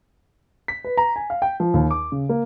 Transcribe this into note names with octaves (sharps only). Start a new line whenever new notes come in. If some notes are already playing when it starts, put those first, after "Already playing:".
B6
B4
A#5
G#5
F5
G5
F3
D#2
D6
C#3
A#3